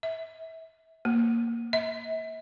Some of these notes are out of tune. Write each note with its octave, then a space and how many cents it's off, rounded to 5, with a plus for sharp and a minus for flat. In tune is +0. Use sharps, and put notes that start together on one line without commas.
E5 -30
A#3 -5
E5 -40